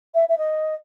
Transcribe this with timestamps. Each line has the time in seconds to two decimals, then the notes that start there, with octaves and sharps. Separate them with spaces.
0.14 E5
0.28 E5
0.38 D#5